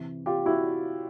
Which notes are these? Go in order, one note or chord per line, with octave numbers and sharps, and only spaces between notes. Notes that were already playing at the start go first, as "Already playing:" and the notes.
Already playing: C3 E3
F4 G4
E4 F#4